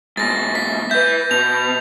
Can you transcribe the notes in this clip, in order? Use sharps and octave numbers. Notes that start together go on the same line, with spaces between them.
G#2 B2 A6 A#6
B6
B4 E5 G6
B2 F7